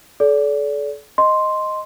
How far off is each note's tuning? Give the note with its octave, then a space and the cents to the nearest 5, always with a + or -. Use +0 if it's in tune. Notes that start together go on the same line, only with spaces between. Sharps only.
A4 -35 D5 -35
D#5 +0 C6 +0